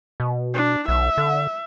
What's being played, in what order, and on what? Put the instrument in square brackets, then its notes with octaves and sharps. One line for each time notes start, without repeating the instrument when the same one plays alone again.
[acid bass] B2
[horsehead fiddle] D4
[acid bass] B1 [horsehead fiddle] E5
[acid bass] D3